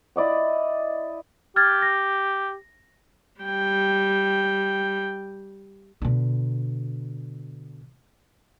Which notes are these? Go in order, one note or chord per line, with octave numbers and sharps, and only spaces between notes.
E4 D5 D#5 F#5
G4 F6 G#6 A6
A#6
G3 G5
B2 D3